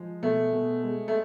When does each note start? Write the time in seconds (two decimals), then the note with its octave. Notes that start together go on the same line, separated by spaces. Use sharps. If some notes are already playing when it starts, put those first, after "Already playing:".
Already playing: F3 G#3
0.22 B2 A3
0.53 B2
0.83 G#3
1.08 A3